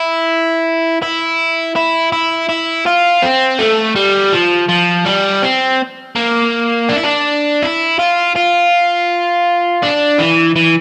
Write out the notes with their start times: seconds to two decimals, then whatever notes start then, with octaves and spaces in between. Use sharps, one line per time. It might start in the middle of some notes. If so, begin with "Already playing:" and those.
Already playing: E4
1.02 E4
1.76 E4
2.12 E4
2.49 E4
2.86 F4
3.22 C4
3.59 A3
3.96 G3
4.33 F3
4.69 F3
5.06 G3
5.43 C4
6.15 A#3
6.89 D4
6.96 E4
7.03 D4
7.62 E4
7.99 F4
8.36 F4
9.83 D4
10.19 E3
10.56 E3